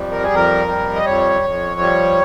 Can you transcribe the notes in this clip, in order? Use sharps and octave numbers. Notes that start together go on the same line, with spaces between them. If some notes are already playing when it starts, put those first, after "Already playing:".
Already playing: F2 G3
A#4
G#4
F2 A#4
G3
D#5
F2 C#5
F2
G3